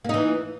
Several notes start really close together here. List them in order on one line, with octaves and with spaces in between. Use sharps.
A#3 D#4 E3